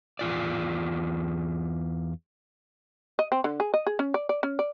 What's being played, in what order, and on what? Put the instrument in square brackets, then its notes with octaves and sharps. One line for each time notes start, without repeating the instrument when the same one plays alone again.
[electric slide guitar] E2 F4 D5
[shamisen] D#5
C4
D3
G#4
D#5
G#4
C#4
D5
D5
C#4
D5